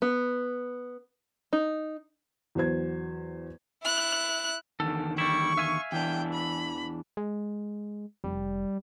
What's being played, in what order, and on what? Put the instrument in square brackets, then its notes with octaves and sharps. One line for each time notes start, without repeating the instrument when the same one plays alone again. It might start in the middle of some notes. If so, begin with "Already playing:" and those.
[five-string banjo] B3
D#4
[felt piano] E2 F#3 C5 G#6
[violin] E4 F#6
[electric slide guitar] E2 D3 D#3 [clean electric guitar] A4
[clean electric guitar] G3 E4 [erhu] C#6
[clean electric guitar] E5 F5 G#5
[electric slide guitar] E2 E3 D4 [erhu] G5
[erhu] B5
[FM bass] G#3
[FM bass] F1 [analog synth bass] G3